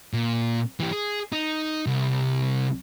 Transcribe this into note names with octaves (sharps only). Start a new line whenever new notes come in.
A#2
E3 G4
G#4
D#4
C2